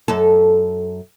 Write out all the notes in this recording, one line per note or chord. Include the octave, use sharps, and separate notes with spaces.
F#2 A4